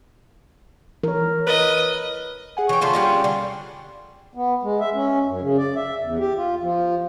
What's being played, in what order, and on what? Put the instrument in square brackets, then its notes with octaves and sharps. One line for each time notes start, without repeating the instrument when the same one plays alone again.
[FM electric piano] E3 C#5 [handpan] A#4
[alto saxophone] B4 [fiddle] D#5
[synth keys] G#4 F#5 G#5
[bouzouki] E3 G5 [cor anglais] C#5
[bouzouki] D3 F3 A3 [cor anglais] F4
[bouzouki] G3 C#4 D4
D3
[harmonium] B3
G#3
E5
C#4
F#2
C#3
D5
E5
E2
G4
F4
F3